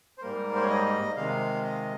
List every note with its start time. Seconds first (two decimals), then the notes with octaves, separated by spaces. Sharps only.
0.18 C5
0.22 G#2 G3 A#3 A#4
0.55 C5
0.62 C#5
0.69 D#5
1.17 C3 D#3 G#3 F5
1.64 D#5